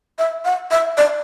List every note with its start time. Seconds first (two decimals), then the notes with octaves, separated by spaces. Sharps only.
0.19 E5
0.45 F#5
0.71 E5
0.97 D5